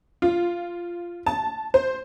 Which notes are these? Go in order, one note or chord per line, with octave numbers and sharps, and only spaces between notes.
F4
A5
C5